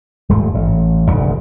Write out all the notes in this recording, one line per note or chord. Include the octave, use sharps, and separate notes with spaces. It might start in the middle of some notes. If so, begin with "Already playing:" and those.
D#1 G#2 A3
A1
F1 D2 G#2